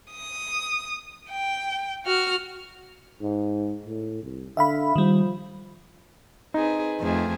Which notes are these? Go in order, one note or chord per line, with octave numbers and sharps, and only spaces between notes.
D#6
G5
F#4 F6
G#2
A2
C2
D3 E5 F5 B5
D#3 F3 G3
C4 D#4 G#4 B4
F2 A3 G#4